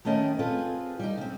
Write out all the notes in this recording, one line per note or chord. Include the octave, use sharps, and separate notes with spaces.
D#3 A3 B3 C#4 D#5 G5
C4 F4 G#4 A4 B4
G3 D#4
C#3 C4